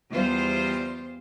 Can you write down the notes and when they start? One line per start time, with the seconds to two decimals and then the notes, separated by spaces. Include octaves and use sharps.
0.10 E2 G3 F4 C5